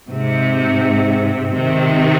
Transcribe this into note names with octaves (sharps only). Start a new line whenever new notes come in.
G#2 C3
C3 D#3